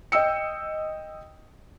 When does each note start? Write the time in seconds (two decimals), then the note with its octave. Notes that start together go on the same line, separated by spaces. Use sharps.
0.12 D#5 G5 E6 C#7